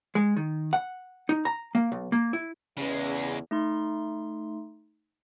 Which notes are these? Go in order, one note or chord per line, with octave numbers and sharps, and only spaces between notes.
G#3
D#3
F#5
D#4
A#5
A#3
B1
A#3
E4
E2 C#3 G#3 C#4
A3 D#4 C6